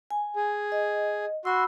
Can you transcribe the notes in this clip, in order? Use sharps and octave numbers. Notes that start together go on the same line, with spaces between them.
G#5
G#4
D#5
F#4 B5 C6 E6